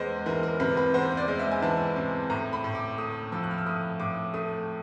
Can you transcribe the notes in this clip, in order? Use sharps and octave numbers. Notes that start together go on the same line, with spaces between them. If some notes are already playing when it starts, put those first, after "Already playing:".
Already playing: E2 G#3 B4 C5
E3 A#4
A#4
C3 B4
B4
E2 C5
D5
G#3
E5
G#5
E3 A5
C3
A2 A#5
B5
A2
D6
A3 D#6
F3 E6
F#6
F6
E6
A2 D#6
A2 D6
A3 D#6